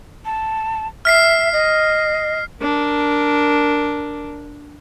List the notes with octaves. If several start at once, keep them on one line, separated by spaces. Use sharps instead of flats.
A5
E5 F6 B6 C7
D#5
D4 A#4